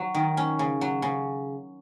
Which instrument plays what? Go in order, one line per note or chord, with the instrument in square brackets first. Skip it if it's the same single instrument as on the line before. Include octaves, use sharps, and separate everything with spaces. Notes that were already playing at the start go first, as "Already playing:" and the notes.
Already playing: [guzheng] F#3
D#3
C#4
C#3
F#3
C#3